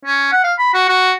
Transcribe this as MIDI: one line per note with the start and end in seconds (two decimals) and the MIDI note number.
0.06 0.29 61
0.33 0.40 78
0.44 0.53 77
0.59 0.72 83
0.74 0.87 66
0.89 1.13 66